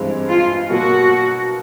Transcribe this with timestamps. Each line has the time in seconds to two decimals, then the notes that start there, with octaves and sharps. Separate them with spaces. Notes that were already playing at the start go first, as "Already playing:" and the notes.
Already playing: G2 E3 G#3 C4
0.29 F4
0.70 B2 F#3 A#3 F#4